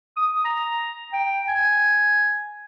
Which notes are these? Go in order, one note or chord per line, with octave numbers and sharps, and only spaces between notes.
D#6
A#5
G5
G#5